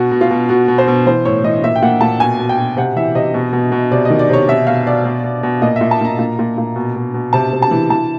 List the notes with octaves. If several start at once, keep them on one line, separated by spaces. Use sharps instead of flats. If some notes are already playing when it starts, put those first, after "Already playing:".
Already playing: B2 F#4
B2
F4
B2
B2 F#4
B2
C5
B2
E3 C5
A2 C#5
E3 D#5
A#2 E5
G5
A#2 F#5
A#2 A5
B2 G#5
B2
G5
B2
C3 F#5
E3 E5
C3 D#5
B2
B2
B2
C3 D5
D#3 D#5
D5
C3 C#5
B2 E5
B2 F5
B2 D5
B2
B2
B2
A#2 D#5
A#2 E5
A5
A#2 A#5
A#2
A#2
A#2
B2
B2
B2
C3 A5
C3
A5
E3
E3 A5